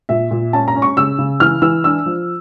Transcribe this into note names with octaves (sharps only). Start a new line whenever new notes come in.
A#2 E5
A#2
C#4 A5
A#5
C#4
C#6
C#3 E6
C#3
E3 F6
E3 E6
D4 E6
F3